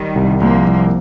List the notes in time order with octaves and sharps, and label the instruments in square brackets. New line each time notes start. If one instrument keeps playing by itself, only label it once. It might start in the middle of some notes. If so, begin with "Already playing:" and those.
Already playing: [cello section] D#3 G3
[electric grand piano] C2
[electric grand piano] C2 [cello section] F3 A#3
[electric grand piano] C2